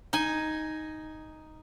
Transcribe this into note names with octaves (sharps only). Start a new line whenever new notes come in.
D#4 G#5